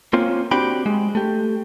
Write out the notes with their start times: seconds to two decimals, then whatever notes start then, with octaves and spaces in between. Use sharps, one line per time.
0.13 A#3 C4 C#4 F4
0.51 C4 D4 F#4 G4 G5 B5
0.86 G#3
1.15 A3 G4